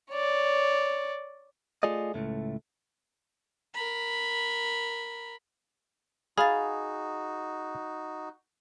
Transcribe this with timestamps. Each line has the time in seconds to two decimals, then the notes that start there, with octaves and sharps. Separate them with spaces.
0.12 C#5 D5
1.83 A3 F4 G#4 D5 D#5
2.14 C#2 A2 C#3 A3
3.75 A#4 B5
6.38 D#4 F#4 G#4 F5 B5 A6